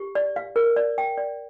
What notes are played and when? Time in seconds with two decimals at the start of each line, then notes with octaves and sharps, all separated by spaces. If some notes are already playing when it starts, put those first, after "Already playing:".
Already playing: G4
0.15 D5
0.36 F5
0.56 A#4
0.76 D5
0.98 G5
1.18 D5